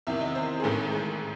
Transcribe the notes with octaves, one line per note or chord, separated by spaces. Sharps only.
E2 C3 D#3 E5
D#5
C5
G#4
A1 G#2 D#3 A4
G#4